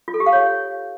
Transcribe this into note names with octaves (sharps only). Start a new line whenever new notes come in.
F4
A4
G4
F5
C#5